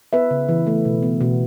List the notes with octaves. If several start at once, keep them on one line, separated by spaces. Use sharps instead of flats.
B3 B4 E5
C#3
E3
A3
B2
B3
B2